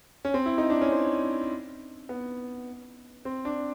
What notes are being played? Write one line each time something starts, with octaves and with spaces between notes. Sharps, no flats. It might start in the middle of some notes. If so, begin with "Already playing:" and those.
C#4
C4
E4
D#4
D4
C#4
C4
B3
C4
D4